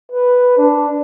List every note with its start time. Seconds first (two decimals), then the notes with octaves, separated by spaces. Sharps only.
0.12 B4
0.58 D4